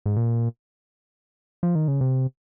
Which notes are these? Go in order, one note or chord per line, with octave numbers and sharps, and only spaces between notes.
G#2
A#2
F3
D#3
C#3
C3